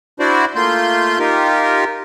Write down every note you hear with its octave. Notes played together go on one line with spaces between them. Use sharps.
D4 E4 F#4 C5 D5
A3 A#3 F4 C6 G6
D#4 F4 G4 A#4